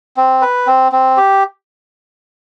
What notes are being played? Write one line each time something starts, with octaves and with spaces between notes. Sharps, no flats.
C4
B4
C4
C4
G4